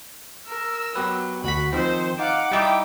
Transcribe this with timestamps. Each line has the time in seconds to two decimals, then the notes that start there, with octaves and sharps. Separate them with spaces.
0.48 A#4 E6
0.96 F#3 B3 G4 B4
1.44 D2 F#4 B5 B6
1.73 D#3 F3 C4 D#4 C5
2.19 D#4 F5 F#5 D6
2.51 G3 D#4 E4 E5 G5